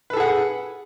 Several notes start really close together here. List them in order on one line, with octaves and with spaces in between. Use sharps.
B4 A4 G#4 F#5